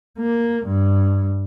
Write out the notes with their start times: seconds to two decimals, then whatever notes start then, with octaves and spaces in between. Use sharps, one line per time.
0.19 A#3
0.65 G2